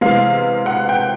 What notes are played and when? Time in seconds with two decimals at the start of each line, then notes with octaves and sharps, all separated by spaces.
0.01 C3 E3 G#3 B3 F5
0.66 F#5
0.89 G5